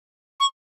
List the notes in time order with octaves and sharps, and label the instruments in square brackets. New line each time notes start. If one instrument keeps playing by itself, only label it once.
[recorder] C#6